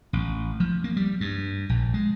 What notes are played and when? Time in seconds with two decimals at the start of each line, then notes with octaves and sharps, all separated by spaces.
0.13 A1
0.60 F3
0.84 A#3
0.97 G3
1.21 G2
1.69 A#1
1.94 G#3